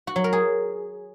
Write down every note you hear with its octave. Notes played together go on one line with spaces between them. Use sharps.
F#4
F#3
A#4
G#4